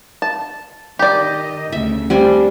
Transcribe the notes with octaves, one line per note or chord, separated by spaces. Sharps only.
A5
D#3 G4 D5 D#5
D2 C#3 A3 E5
G3 A3 C4 D4 G#5